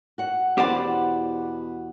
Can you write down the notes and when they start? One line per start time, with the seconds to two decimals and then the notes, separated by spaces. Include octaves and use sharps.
0.18 F#4 F#5
0.58 E2 B2 G4 C5 D5 F#5 B5